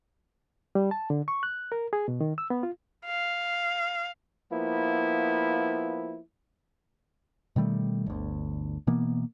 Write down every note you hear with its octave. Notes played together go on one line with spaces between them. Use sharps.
G3
A5
D3
C#6
F#6
A#4
G#4
B2
D#3
E6
B3
F4
F5
F3 A#3 B3 E4
B2 D#3 G3 A3
G1 D2
B2 E3 A#3 B3